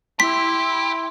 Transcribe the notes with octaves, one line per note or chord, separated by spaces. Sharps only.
E4 G4 C6 B6